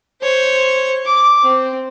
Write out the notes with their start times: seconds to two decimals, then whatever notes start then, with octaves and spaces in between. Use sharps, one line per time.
0.21 C5 C#5
1.06 D6
1.43 C4